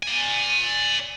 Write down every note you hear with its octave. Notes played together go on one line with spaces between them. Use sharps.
D5 G#5